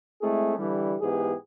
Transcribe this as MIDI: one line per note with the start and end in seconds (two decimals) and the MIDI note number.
0.22 0.53 56
0.22 0.53 57
0.22 0.53 60
0.22 0.53 64
0.22 0.53 68
0.57 0.95 50
0.57 0.95 52
0.57 0.95 55
1.01 1.33 44
1.01 1.33 52
1.01 1.33 59
1.01 1.33 67
1.01 1.33 68